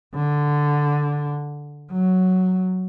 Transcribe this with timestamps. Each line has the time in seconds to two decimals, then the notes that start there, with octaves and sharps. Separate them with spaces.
0.15 D3
1.92 F#3